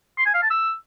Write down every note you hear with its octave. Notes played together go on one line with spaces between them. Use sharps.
C6
G#5
F5
A5
E6